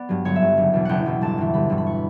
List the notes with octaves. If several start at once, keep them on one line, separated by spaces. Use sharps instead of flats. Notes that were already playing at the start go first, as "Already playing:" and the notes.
Already playing: B3 D5
G2 F#3
G1 C#5
E5
G2 F#3
F#1
E2 B2
F#1 F#5 G5
E2 B2
G1 A5
G2 E3
G1 B5
G2 E3
B5
C#6